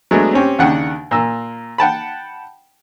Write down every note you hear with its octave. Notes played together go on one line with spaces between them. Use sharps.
F#3 G#3 A3 B3 D4
C4 C#4 G4
D#2 C#3 D4 F#5 G5
A#2 A#3 E6
F#5 G5 A5 B5